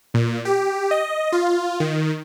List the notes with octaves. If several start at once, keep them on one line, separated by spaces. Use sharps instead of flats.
A#2
G4
D#5
F4
D#3